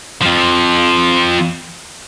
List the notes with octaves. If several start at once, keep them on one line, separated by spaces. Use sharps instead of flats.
F2 F3